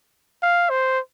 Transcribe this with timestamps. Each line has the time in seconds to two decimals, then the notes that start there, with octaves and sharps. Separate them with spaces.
0.43 F5
0.70 C5